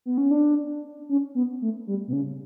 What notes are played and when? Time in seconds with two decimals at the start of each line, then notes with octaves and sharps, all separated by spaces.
0.06 B3
0.18 C#4
0.31 D4
1.09 C#4
1.35 B3
1.62 A3
1.87 G3
2.07 B2
2.13 C#3